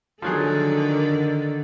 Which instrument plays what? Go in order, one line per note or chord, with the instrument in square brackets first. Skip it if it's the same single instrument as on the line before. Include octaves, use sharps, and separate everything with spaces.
[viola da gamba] D3 D#3 A4 [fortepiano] F3 F#3 G#4